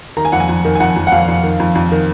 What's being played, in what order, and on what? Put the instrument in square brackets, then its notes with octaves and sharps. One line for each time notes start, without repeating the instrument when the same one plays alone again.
[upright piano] D#3 A#5
G#5
F2 F#5
G#5
F2
D#3
G#5
F2 F#5
F2
F#5
F2 F5
F2
D#3
F2
F2
D#3